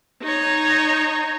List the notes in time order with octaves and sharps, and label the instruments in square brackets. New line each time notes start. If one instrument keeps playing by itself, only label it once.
[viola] D#4 C#5